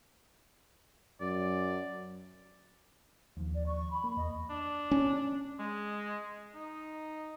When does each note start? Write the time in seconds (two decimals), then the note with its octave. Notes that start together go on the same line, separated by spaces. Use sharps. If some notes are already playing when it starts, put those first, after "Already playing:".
1.21 F#2 D5
3.37 D#2 F3
3.54 D5
3.66 C#6
3.91 B5
4.04 A#3
4.17 E2 D#5
4.50 D4
4.91 C#4
5.59 G#3
6.55 D#4